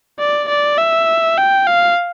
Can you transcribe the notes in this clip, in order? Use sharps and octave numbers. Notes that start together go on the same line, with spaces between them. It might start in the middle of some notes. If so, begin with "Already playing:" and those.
D5
D5
E5
G5
F5